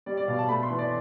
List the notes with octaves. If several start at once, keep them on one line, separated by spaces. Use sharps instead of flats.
G3 D5
D5
B2 F5
A5
A3 B5
C6
E3
D5